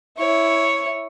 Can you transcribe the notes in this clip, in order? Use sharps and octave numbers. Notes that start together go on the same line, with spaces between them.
E4 C#5